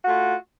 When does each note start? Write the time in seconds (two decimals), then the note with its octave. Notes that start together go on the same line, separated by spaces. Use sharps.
0.01 F#4
0.05 A3
0.08 F4